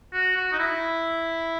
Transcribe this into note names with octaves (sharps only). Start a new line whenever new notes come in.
F#4
F#4
D#4
E4